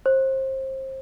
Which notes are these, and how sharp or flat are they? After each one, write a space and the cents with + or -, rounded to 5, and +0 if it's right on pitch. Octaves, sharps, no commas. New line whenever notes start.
C5 +25